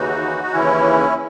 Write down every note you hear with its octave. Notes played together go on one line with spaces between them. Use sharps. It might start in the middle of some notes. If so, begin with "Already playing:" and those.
Already playing: D#2 C#3 E3 D#4 F#4
D#4
D#2 C#3 E3 C#4 E4